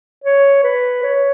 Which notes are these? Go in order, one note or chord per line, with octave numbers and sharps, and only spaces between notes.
C#5
B4
C#5